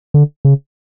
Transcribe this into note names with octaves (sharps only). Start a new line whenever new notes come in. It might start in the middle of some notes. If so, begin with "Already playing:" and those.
D3
C#3